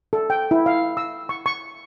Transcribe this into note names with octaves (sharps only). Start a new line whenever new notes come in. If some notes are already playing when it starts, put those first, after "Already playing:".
A4
G5
E4
F5
E6
C#6
C#6